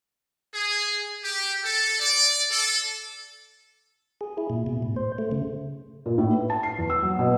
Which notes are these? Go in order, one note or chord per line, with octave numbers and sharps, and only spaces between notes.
G#4
G4
A4
D5
A4
G#4
E4
A#2
B2
A2
C5
A3
C#3
A#2
A2
B4
A5
C7
E2
E6
F#3
B2